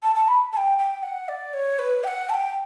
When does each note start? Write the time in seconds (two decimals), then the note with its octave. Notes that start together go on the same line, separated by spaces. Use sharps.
0.03 A5
0.15 A5
0.28 B5
0.53 A5
0.57 G5
0.78 G5
1.03 F#5
1.28 D5
1.54 C#5
1.79 B4
2.04 G5
2.07 F#5
2.29 A5
2.34 G5